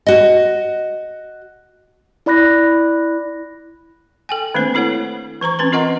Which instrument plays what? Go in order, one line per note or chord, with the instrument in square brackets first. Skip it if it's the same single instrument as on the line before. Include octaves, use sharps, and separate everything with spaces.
[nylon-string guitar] F#4 D#5
[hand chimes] E4 D5 B5 F#6 A#6
[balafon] A4 G5 G#5
D#3 A3 A#3 C4 D4 C5
D4 E4 A4 C#5 F#5
E3 C5 A#5 C#6
E3 C4 C#4 B4 C6
F4 A#4 D#5 F#5 A#5